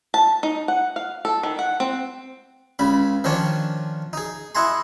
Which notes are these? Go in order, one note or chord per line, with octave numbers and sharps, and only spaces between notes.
A5
D#4
F#5
F5
A4
D#3
F#5
C4
C#2 C#3 B5
D#3 F3 C#4 D4 C#5
D#4 G#4
E4 D#5 F#5 G#5 A#5 C6